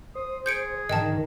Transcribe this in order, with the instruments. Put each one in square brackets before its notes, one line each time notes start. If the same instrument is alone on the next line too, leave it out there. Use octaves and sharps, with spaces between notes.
[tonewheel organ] C5 [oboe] D#6
[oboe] G#4 [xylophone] G6 C#7 D7
[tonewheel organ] G#2 D3 A#4 [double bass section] D#3 [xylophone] D#5 G5 A5